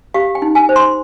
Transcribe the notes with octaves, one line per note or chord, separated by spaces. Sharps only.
G4 F5
G5
D#4
G#5
C5
C6